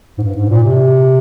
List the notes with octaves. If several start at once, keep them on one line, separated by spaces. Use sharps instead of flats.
G#2
G2
G#2
A#2
C3